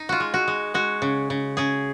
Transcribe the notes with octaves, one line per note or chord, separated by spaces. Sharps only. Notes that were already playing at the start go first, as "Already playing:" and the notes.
Already playing: D#4
F4 F#4
G#3
F#4
G#3
G#3 F#4
C#3
C#3
C#3 G#4